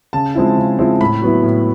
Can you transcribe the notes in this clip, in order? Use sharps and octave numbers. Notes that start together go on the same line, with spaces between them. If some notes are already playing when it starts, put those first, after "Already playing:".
C#3 A5
F3 G#3 C4 E4
C#3
F3 G#3 C4 E4
A2 B5
F#3 B3 E4
A2